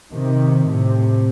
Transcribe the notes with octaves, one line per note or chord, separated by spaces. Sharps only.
C3 D#3
A2 C3